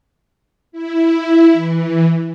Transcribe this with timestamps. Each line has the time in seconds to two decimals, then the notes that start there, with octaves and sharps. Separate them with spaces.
0.72 E4
1.53 E3